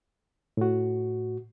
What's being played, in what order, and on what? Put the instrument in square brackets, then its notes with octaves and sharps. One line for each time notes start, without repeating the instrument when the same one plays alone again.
[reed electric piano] A2 F#4